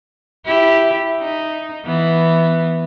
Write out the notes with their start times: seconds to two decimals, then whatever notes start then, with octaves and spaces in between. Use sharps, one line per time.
0.45 E4 G4
1.20 D#4
1.86 E3 B3